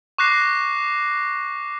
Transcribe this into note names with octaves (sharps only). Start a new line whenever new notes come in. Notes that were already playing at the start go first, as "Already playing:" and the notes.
C#6 D6 F#6 A#6 C7